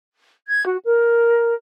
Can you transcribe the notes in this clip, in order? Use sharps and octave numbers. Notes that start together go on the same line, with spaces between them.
G#6
F#4
A#4